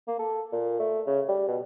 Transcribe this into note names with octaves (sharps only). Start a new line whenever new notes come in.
A#3
A4
A#2
A3
C#3
G3
B2